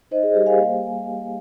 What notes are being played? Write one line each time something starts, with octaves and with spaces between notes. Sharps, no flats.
D#4 C5 D#5
G#4
G3 G4 A#4
F5 G#5
A#3
A#3